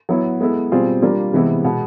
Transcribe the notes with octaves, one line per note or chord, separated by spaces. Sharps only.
F#3 B3 E4
G#3 B3 E4 A4
B2 G3 C4 F4 G#4
G3 A#3 D4 F4
C3 E3 G#3 B3 E4
B2 G#3 B3